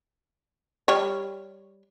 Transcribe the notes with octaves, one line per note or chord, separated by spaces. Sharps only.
G3 C#5